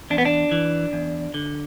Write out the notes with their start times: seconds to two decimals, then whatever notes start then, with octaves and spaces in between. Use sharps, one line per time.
0.10 E2 D4
0.18 B3
0.25 D4
0.51 E3
0.93 E2
1.34 D3